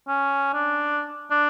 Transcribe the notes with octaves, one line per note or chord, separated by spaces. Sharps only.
C#4
D4
D4